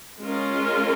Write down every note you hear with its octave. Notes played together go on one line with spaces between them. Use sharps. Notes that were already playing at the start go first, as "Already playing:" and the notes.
G#3 C#4 F4 A#4